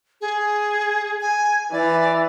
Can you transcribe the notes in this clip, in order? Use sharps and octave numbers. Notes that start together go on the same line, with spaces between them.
G#4
G#5
E3 D5